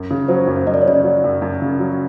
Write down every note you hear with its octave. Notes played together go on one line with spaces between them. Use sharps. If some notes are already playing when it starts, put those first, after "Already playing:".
Already playing: F#2
C#3
F#3 C5
F#2
F#2 D#5
D5
C#5
C#3 D5
F#3
F#2
F#2
C#3
F#3